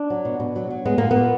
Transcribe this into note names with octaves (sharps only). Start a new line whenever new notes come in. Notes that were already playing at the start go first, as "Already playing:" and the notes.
Already playing: D4
F#3
B2
B2
F#3
F#3
G#3 B3
A#2 A#3
B3
A#2